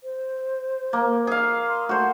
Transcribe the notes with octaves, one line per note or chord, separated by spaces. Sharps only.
C5
A#3
G#4 F5
C6
A3 F#4 C5